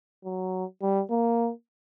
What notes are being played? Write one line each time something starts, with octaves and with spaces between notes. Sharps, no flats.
F#3
G3
A#3